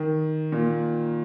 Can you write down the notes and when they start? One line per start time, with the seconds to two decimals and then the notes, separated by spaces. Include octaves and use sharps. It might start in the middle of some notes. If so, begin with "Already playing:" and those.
Already playing: D#3
0.52 A#2